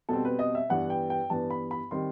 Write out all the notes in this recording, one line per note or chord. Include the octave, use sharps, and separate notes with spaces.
B2 G3 C4 A4
B4
D#5
E5
G2 E3 B3 F#5
G5
G5
G2 E3 B3 A5
B5
B5
D#3 G3 C4 C6